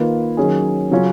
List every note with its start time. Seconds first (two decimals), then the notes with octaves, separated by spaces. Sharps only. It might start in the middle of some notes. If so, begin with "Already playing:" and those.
Already playing: D#3 A#3 F4 B4
0.37 D#3 F#3 C#4 G#4
0.91 C#3 F#3 C#4 F4